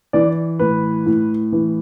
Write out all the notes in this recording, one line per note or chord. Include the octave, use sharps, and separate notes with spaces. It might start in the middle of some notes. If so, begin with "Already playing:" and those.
E3 D5
A2 B4
A2
E3